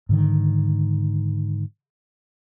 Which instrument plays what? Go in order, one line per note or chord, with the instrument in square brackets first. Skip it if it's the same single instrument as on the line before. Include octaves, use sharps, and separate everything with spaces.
[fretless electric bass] G#2 D3 D#3